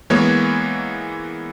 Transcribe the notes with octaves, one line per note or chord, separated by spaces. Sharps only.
E3 G#3 A#3 B3 C#5